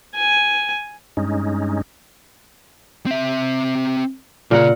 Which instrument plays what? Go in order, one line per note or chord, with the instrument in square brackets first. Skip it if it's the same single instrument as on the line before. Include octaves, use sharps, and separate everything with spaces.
[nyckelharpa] G#5
[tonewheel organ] G2 G#3 C#4 D#4
[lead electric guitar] C4 E5
[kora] A#2 A#4 F#5 [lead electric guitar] C#3 G#4